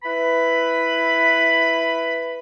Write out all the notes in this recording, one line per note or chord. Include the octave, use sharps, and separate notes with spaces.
E4 B4 B5